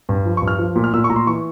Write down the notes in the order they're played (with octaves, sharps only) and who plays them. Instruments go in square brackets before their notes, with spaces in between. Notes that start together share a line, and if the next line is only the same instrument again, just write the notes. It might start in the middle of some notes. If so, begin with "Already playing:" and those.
[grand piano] G2
F3
C#6
G2
F6
F3
A#2
F6
A#2 E6
C#6
A#2 A#5
C6
E3 C#6